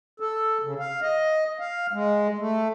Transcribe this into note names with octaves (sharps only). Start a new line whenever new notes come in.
A4
C#3
F5
D#5
F5
G#3
A3